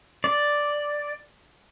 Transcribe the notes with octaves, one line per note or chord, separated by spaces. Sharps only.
D5